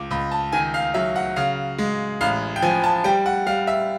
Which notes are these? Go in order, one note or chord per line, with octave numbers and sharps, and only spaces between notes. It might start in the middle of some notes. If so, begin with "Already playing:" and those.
Already playing: C#2 D6
C#2 B5
A5
D#3 G#5
F5
F#3 E5
F#5
C#3 F5
G#3
A1 F5
G5
F3 G#5
A5
G3 G5
F#5
G3 F5
E5